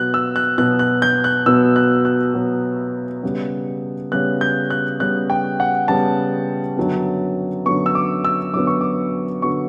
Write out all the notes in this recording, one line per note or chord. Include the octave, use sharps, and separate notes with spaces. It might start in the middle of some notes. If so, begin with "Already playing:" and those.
Already playing: B2 F#3 B3 F#6
E6
F#6
B2 F#3 B3 F#6
F#6
G6
F#6
B2 F#3 B3 E6
F#6
F#6
B2 F#3 B3
C#3 G3 B3
C#3 G3 B3 F#6
G6
F#6
C#3 G3 B3 F#6
G5
F#5
C#3 G3 B3 A5
F#2 D3 F#3 B3
F#2 D3 F#3 B3 C#6
E6
D6
E6
F#2 D3 F#3 B3 D6
C#6
D6
D3 F#3 B3 C#6